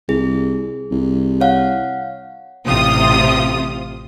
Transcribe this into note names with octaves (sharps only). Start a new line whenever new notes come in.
C2 G#4
C2
C#5 F5 F#5
A1 C3 F4 D#6